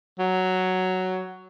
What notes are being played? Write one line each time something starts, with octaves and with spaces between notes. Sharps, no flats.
F#3